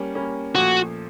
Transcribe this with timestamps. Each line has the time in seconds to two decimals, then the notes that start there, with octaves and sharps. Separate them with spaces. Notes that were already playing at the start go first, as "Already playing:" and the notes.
Already playing: G3 A#3 C#4
0.15 G3 A#3 C#4
0.55 A#2 F3 A3 F#4